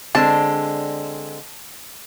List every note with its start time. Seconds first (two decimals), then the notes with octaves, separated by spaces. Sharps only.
0.15 D3 G#3 C4 A5